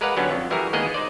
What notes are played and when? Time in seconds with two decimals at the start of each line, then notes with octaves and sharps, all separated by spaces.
0.01 G#3 A#4 B4 D5 F5 F#5
0.16 D3 F#3 G3 B3 C#4 D4
0.31 F2
0.50 E3 G3 E4 F#4 G#4 A#4
0.73 D#3 G#3 A#3 B3 G#4 D#5
0.94 D#4 C5 D5